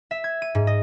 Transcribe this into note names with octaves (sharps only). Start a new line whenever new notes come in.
E5
G#6
D#7
G#2
D#5